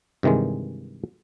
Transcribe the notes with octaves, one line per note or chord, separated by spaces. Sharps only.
G2 C3 D#3 E3 G#3